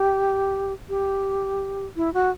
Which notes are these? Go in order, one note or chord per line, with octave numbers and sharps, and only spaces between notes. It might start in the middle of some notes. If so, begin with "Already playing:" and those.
Already playing: G4
G4
E4
F#4